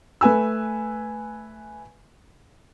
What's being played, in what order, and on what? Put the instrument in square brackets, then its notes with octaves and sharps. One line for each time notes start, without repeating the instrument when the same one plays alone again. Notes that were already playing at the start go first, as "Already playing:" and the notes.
[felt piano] A3 B4 G#5 E6